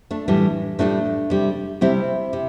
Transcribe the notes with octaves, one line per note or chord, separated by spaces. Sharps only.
A3 D4
A2 E3 G3
A2 E3 G3 A3 D4
C3 G3
C3 G3 C4 E4
C3